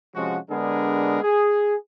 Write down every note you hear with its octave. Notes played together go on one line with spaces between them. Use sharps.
C3 F3 G#3 C#4 F#4
D3 G#3 B3 D4 G#4 A#4
G#4